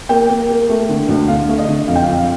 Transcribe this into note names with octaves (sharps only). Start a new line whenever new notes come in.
A#3 G5
A#3
A#3
A3
D3
D2
D3 F5
A3
D#5
D3
F2 F5
G5
F2 F5
F5